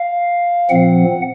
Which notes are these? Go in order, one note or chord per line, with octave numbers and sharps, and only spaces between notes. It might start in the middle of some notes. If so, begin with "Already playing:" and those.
Already playing: F5
A#2 F3 C4 F#5